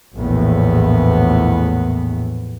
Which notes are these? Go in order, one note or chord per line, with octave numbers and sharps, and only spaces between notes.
A#1 E2 A2 B3